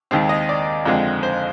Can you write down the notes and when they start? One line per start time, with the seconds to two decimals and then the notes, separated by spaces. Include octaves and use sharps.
0.11 D#2 D#3 G#3 C4
0.29 D#5
0.49 D5
0.86 F2 D3 G#3 C4
1.23 C5